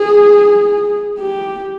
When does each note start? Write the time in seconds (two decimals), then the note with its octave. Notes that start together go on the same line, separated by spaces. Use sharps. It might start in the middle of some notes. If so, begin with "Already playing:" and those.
Already playing: G#4
1.19 G4